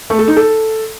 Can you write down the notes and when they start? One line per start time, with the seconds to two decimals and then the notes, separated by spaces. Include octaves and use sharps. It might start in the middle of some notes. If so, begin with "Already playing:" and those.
0.10 A3
0.19 A4
0.28 D#4
0.36 A4